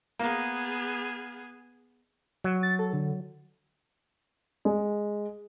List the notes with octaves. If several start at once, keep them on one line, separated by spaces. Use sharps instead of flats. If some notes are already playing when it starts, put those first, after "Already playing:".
A#3 B3 G#4
F#3
A6
A4
D3
G#3